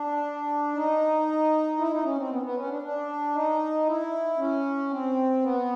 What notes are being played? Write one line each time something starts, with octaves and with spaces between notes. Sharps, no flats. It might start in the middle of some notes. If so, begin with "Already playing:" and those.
Already playing: D4
D#4
E4
D#4
C#4
C4
B3
B3
C#4
D4
D4
D#4
E4
C#4
C4
B3